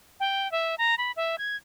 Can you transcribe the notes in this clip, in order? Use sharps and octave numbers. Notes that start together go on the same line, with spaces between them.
G5
E5
A#5
B5
E5
G#6